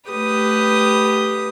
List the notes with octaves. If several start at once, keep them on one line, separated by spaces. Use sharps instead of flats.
A3 G4 B4 D#6